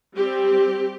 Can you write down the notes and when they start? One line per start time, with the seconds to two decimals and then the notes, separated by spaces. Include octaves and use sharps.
0.15 G3 C4 G4